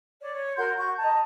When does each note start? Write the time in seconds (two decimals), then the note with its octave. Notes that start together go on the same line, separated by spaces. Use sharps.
0.19 C#5 D5
0.32 C#5
0.57 F#4 A#4 C6 G6
0.77 F#4 C#6 G6
0.99 D#5 A5 A#5